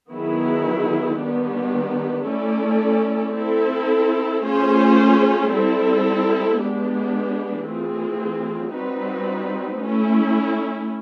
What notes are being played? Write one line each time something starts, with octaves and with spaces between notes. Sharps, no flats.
D#3 F#3 B3 E4 G#4
D#3 G3 B3 D4 G4
A3 C#4 E4 A4 D5
C4 E4 A4
A3 C#4 F4 G#4 C5
G3 C4 E4 A4
G#3 B3 D4 G4
E3 A3 C4 F4 G#4
G3 C4 D#4 F#4 B4
A3 C#4 E4